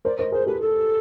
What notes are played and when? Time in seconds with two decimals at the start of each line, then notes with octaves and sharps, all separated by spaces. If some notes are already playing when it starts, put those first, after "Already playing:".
0.05 A#4 C5 D5
0.19 A#4 C5 D#5
0.32 G#4 A#4 C5
0.47 G4 A4 B4
0.60 A4